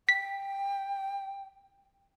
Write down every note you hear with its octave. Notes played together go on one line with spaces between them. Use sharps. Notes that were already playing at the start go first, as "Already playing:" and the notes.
G5 B6